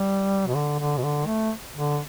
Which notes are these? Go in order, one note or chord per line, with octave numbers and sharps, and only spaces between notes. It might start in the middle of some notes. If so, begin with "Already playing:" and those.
Already playing: G3
B2
D3
D3
B2
D3
A3
D3